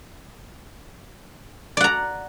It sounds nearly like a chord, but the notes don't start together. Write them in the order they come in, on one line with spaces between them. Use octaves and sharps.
D5 F#5 A#5